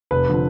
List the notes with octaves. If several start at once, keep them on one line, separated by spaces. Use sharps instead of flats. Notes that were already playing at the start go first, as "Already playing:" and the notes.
F1 B4
D3 F3